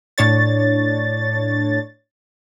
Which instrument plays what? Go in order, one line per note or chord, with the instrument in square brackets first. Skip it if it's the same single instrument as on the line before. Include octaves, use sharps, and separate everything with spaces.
[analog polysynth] A2 D4 C#5 A6